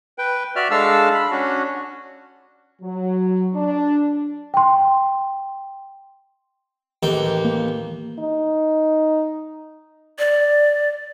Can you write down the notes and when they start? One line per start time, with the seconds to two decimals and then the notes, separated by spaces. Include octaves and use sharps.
0.18 B4 G5
0.56 F#4 D5 E5 F6
0.71 G#3 D4 A4 F5 A5 E6
1.14 B5
1.31 C#4 D4 F#4
2.82 F#3
3.55 D4
4.54 G5 C6
7.03 A1 D#2 G5
7.45 A#3
8.19 D#4
10.19 D5